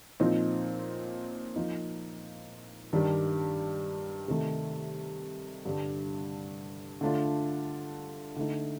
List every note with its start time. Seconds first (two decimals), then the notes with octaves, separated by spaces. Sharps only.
0.20 A#2 F3 C4 D#4
1.56 F3 A#3 D#4
2.93 G2 D#3 G3 D4 G4
4.28 C3 D#3 A3
5.65 G2 D3 G3 D4
7.01 D3 A3 D4 F4
8.36 D3 A3 D#4